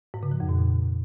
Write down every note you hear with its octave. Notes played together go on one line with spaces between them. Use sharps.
G#2
C#3
F3
F2
A#2